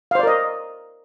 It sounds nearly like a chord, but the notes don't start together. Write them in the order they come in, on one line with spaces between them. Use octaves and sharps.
F5 C5 D5 A#4 D#5